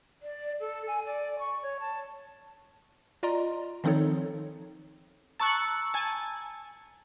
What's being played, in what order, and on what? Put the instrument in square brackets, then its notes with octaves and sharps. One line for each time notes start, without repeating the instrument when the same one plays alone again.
[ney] D5
A4
G#5
D5
C#6
C#5
A5
[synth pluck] F4 D5 D#5 A#5 C6
D#3 F3 C4 D#4 A4 C#5
[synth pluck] A5 C#6 F#6 [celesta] A#5 E6 C#7
[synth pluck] G#5 A5